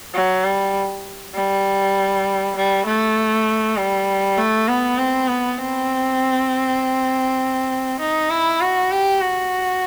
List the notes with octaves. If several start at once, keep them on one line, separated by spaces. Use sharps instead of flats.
F#3
G3
G3
G3
A3
G3
A3
B3
C4
B3
C4
D#4
E4
F#4
G4
F#4